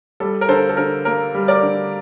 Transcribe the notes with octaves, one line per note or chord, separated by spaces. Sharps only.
G3 A4
A#4
D3 A4 C5
A4
D3 A#4
A#3 A#4
G3
A#4 D5
D3